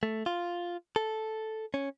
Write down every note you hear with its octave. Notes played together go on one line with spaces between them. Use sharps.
A3
F4
A4
C#4